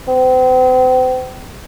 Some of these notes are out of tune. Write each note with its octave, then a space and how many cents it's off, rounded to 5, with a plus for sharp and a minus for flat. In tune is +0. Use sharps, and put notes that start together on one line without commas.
C4 -40